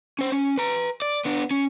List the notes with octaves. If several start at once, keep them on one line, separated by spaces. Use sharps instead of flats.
C#4 C5
C#4
B4 A#5
D5
B3 D4
C#4